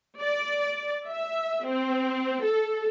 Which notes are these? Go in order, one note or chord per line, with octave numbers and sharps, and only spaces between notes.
D5
E5
C4
A4